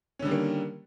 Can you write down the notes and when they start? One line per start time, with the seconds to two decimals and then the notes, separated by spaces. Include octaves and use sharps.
0.19 C#4
0.22 D3
0.25 G3
0.28 D#3
0.31 A#3